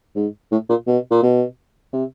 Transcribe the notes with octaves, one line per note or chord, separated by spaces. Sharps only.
G#2
A2
A#2
B2
A#2
B2
C3